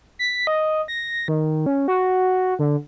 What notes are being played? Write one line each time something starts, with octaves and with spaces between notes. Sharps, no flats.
B6
D#5
A#6
D#3
C#4
F#4
D3